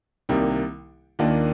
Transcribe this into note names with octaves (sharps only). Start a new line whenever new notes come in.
C2 C3 D#3 G3 A#3
D#2 D#3 A#3 D4 F4